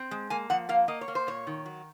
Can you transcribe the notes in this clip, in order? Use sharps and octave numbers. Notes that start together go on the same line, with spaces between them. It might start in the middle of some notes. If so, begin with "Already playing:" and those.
Already playing: C4
G#3
A#3 G#5
F3 F#5
A#3 F5
A#3 D#5
C#5
A#3
C5
A#2 C#5
D#3
F#3